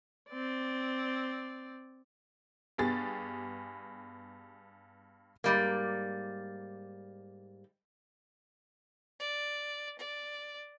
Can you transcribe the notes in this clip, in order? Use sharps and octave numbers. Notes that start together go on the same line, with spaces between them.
C4 D5
G2 B3 G4 G#4 A6
G#2 G3 A#3
D5
D5